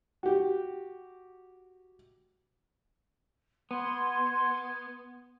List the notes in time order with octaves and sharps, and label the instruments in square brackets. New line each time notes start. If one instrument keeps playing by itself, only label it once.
[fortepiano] F#4 G4
[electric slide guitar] B3 [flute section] F#5 C6 G#6